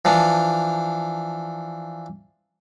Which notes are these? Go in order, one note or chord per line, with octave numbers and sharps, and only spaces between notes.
E3 F3 D4